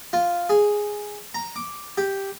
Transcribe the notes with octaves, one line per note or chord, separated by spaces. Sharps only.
F4
G#4
A#5
D6
G4